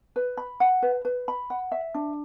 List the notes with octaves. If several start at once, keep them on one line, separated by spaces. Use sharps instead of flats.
B4
B5
F#5
B4
B4
B5
F#5
E5
D4